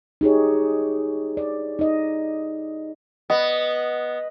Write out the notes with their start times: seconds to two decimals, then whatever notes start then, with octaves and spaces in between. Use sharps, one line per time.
0.21 D#4 G4 G#4 C#5
1.37 D5
1.79 D#4 D#5
3.30 B3 D#5